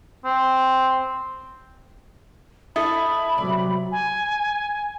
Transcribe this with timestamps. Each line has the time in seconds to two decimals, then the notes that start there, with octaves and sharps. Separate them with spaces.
0.25 C4
2.76 E4 A4 D#5 A5 B5
3.38 C3 F#3 D5
3.92 G#5